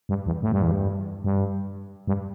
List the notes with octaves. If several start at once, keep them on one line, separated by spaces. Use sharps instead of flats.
G2
E2
A2
G2
E2
G2
G2
G2